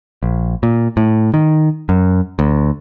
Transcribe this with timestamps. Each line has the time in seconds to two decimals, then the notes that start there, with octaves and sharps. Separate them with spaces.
0.23 A#1
0.63 A#2
0.97 A2
1.34 D#3
1.89 F#2
2.39 D2